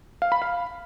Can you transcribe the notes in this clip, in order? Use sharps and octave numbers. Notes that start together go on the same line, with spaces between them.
F5
B5
F5